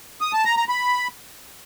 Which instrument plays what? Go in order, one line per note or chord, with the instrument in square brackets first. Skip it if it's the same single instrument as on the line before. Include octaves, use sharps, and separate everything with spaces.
[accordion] D#6
A5
A#5
A#5
B5